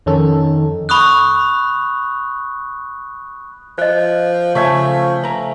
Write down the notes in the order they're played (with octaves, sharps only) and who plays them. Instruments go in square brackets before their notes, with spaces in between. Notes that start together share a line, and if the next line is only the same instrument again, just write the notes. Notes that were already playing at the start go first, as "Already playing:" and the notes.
[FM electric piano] F2 C#4 A4 [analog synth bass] D#3
[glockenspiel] B5 C#6 D#6 F#6
[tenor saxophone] F3 [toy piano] C5 D#5
[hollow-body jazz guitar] C#3 [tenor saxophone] F3 [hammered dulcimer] A3 E5 G#5
[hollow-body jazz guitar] B4 A#5